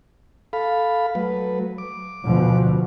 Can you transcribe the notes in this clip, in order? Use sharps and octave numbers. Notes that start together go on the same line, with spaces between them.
A4 F5 B5
F#3 A3 B4
D6
D2 B2 F3